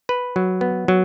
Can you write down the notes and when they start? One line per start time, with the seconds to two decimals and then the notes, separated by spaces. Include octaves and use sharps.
0.09 B4
0.36 F#3
0.61 B3
0.88 F#3